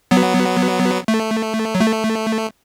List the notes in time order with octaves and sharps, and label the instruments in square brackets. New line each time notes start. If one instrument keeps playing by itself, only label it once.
[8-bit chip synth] F#3 B3
A3
F#3
A3